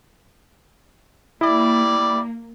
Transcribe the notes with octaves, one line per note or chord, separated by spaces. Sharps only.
G3 A#3 E4 D5